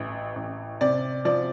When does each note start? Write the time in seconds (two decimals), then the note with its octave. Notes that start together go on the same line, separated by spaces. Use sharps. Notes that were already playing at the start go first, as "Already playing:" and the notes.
Already playing: A1 A2 E3
0.36 A1
0.81 C3 D5
1.25 F3 D5